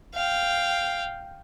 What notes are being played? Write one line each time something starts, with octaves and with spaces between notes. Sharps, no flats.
F5 G5